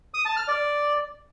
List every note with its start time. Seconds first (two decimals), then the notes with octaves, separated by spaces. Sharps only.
0.14 D#6
0.25 A5
0.37 F6
0.48 D5